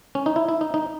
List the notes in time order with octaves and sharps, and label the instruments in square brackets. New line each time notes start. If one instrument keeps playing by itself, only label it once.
[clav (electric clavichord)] C#4
D#4
E4
E4
D#4
D#4